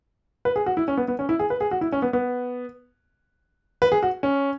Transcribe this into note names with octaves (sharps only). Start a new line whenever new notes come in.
B4
G#4
F#4
E4
C#4
B3
B3
C#4
E4
G#4
B4
G#4
F#4
E4
C#4
B3
B3
B4
G#4
F#4
C#4